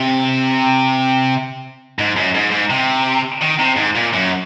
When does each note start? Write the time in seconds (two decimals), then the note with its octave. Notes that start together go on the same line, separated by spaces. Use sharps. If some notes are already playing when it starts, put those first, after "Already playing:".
Already playing: C3
1.99 G#2
2.16 F#2
2.34 G#2
2.51 G#2
2.70 C3
3.41 D#3
3.59 C3
3.76 G#2
3.95 A#2
4.13 F#2